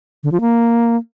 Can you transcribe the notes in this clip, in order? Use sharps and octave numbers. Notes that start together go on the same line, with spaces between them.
D3
F3
A#3